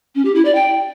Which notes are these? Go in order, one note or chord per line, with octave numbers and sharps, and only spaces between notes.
C#4
G4
E4
D5
G5